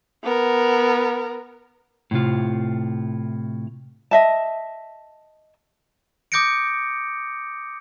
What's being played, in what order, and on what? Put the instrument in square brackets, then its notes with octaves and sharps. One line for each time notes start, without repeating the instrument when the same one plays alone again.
[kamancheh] B3 A#4
[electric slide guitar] A2 C3 F4
[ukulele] D#5 E5 A5
[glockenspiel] D6 D#6 G6 A#6 C#7 D7